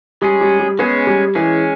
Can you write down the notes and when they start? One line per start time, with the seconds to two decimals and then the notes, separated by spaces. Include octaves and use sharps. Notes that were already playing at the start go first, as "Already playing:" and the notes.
0.21 G3 G#3 C#4 G#4
0.41 G3
0.60 G3
0.79 G#3 B3 C#4 G#4
1.07 G3
1.35 E3 G#3 C#4 G#4